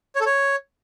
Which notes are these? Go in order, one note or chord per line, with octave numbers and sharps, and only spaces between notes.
C#5
A4
C#5